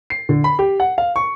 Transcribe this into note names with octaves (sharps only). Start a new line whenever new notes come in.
C7
D3
B5
G4
F#5
F5
C#6